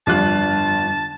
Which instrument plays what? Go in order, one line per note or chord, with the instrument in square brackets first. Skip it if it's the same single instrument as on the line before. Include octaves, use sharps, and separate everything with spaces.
[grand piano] G1 F4 F#6 [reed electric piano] F2 G3 [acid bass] D4 [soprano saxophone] A5